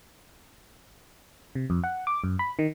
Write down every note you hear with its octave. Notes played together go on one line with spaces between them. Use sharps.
C3
F2
F#5
D6
F#2
B5
D#3